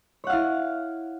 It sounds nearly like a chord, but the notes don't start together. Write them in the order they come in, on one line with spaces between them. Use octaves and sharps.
C#5 F#5 F5 E4